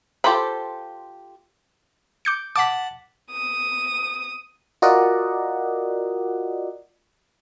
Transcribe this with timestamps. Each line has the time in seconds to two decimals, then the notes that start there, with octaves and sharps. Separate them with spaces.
0.24 F4 G4 A4 C5 B5
2.25 D6 G6 C#7
2.56 F#5 A5 D6 B6
3.31 D#6
4.82 F4 F#4 A#4 D5 D#5 F#5